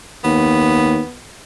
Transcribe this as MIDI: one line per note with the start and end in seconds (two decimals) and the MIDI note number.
0.24 1.00 39
0.24 1.17 59